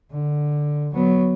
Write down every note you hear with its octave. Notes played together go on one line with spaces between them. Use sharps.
D3
F#3 B3